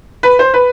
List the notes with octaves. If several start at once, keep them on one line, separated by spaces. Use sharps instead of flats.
B4
C5
B4